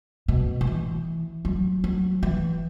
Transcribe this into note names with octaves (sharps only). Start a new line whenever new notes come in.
B2
F#3
E3
F#3
F#3
E3